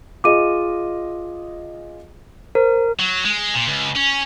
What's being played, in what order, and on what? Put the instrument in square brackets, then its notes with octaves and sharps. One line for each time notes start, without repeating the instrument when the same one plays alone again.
[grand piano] F4 G#4 D#5 [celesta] D6 D#7
[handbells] A#4 [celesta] C5
[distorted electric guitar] F#3
G#3
A#2
C#2
C#4